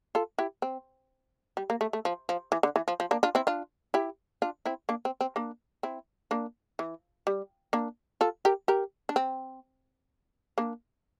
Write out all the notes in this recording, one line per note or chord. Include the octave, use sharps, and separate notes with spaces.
F4 A4
E4 G4
C4
G3
A#3
A3
A3
F3
F3
E3
D3
E3
F3
F3
A#3 D4
D4 F4
C4 E4
D4 F4
E4 G4
D4 F4
C4 E4
A#3 D4
C4
C4
A#3 D4
C4 E4
A#3 D4
E3
G3
A#3 D4
F4 A4
G4 A#4
G4 A#4
D4
C4
A#3 D4